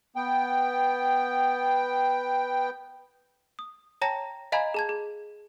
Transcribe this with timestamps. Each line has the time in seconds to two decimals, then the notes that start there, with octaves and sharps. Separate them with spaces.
0.16 B3 G5
3.59 D#6
4.02 C#5 G5 A5 A#5 A#6
4.52 D#5 F5 G#5 A#5 B5 G#6
4.74 G#4 A5 G#6
4.89 G#4